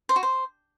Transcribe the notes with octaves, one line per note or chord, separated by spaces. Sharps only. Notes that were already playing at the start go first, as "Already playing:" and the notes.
C5
F#4
C5